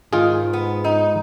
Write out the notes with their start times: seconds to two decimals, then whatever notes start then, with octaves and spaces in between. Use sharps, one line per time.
0.13 G#2 D#3 F4 G#4
0.53 B3
0.84 D#4